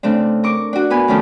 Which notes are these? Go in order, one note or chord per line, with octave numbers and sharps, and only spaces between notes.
C#3 A3 C4 D4
A#4 C#6 D6
D4 F#4
A#3 B3 B4 G#5
D#3 F3 A3 C#4 D4 A4